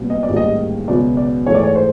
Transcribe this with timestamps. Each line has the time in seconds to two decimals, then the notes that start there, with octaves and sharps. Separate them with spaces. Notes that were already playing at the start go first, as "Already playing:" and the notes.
Already playing: C2 A#2 F#3 B3
0.10 D#5
0.23 D5
0.29 A1 G#2 D#3 G3 A#3
0.37 D#5
0.88 C#2 B2 F#3 B3 D5
1.17 D5
1.47 G#2 E3 A3 C#5
1.55 D5
1.63 C#5
1.76 C5